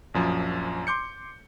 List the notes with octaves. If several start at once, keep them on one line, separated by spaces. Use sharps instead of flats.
A#1 F#2 F3
C6 D6 G6 C#7